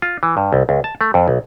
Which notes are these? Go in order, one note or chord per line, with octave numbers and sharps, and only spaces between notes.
F4
E3
G2
C2
C#2
A5
A3
F2
B1